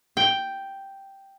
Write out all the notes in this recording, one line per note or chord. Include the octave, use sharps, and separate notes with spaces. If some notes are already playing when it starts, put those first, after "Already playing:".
G5